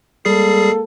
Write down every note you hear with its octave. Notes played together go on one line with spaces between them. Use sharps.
G3 G#3 A#3 G#4 A4 C7